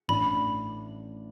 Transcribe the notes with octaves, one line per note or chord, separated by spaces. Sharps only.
A1 A2 E3 A3 D4 B5